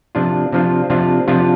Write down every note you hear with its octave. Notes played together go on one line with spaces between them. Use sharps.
C3 F3 D4 F4
C3 F3 D4 F4
C3 F3 D4 F4
C3 F3 D4 F4